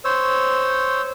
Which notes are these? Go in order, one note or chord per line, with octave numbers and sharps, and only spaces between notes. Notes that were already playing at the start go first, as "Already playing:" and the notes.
C5 C#5 E6